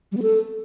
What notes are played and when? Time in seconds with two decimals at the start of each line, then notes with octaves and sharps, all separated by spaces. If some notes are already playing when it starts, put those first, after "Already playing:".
0.12 G3
0.17 B3
0.22 A4